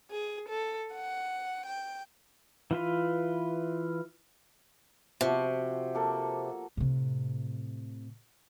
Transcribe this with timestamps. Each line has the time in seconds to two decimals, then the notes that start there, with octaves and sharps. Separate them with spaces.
0.10 G#4
0.49 A4
0.95 F#5
1.67 G5
2.71 E3 F4 B4
5.21 C3 F3 F#4
5.95 A#3 A4
6.77 A2 C3